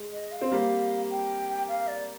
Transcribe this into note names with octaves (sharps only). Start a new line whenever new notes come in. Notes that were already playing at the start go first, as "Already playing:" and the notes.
Already playing: G#3
D#5
F5
C4
G3 A#3
G5
F5
D5